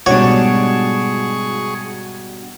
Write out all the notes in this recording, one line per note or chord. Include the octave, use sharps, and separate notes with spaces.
G#2 B2 G3 D4 F#4 G#4 C#5 C#6